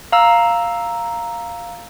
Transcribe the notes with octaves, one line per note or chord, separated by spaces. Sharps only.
F5 A#5 E6